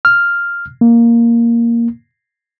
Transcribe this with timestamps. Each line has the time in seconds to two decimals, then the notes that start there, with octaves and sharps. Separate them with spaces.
0.05 F6
0.81 A#3